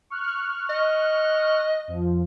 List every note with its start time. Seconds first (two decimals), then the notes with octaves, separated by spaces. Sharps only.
0.10 C#6 F6 F#6
0.69 D#5
1.88 F2 F3